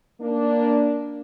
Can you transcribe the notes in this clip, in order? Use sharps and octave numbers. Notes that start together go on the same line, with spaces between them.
A#3 D4